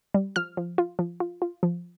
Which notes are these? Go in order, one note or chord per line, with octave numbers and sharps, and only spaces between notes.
G3
F3 F6
F3
F4
F3
F4
F4
F3